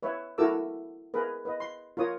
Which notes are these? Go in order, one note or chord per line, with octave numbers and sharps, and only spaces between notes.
B4 C#5 E5
E4 F#4 A4 A#4 D6 E6
G#4 A#4 B4
B4 D#5
C6
F4 A#4 C#5 D#6